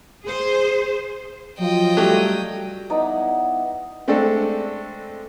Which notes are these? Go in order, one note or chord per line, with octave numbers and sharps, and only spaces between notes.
G#4 C5
F3 F#3 F4 D#5 G5
F#3 G3 A3 G4
B3 D#4 E4 D5
G#3 A3 C4 D4 A4